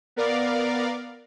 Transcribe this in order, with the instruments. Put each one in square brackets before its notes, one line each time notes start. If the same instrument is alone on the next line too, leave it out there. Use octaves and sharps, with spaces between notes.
[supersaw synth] B3 A#4 D5 F5